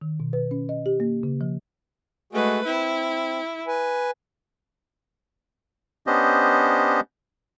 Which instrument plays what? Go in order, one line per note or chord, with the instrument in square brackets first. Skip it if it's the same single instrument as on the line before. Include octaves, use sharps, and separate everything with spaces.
[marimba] D#3
B2
B4
C#4
D#5
G4
A#3
C#3
F3
[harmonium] G#3 F#4 G#4 [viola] A3 B4
[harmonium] C4 [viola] E4
[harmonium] B4 G#5
[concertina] B3 C#4 D4 G4 C5 D#5